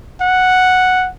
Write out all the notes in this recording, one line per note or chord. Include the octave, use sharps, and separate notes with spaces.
F#5